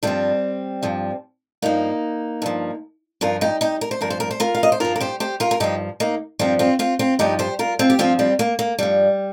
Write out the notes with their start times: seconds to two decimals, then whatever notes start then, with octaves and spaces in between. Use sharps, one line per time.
0.03 G2 F3 G3 C4
0.83 G2 F3
1.62 G2 F3 A#3 D#4
2.42 G2 F3
3.21 G2 F3 F4 A#4
3.41 D#4 G4
3.61 D#4 G4
3.81 A#4
3.91 C5
4.01 G2 F3 A#4
4.10 C5
4.20 A#4
4.31 C5
4.40 F4 A#4
4.55 F5
4.63 D#5
4.72 C5
4.80 G2 F3 F4 A#4
4.96 A#4
5.01 G4 C5
5.20 G4 C5
5.40 F4 A#4
5.51 A#4
5.60 G2 F3 D#4 G4
6.00 A#3 D#4
6.39 G2 F3 G3 C4
6.59 C4 F4
6.79 C4 F4
6.99 C4 F4
7.19 G2 F3 D#4 G4
7.39 G4 C5
7.59 F4 A#4
7.79 C4 F4
7.90 G4
7.99 G2 F3 C4 F4
8.19 G3 C4
8.39 A#3
8.59 A#3
8.79 G2 F3 G3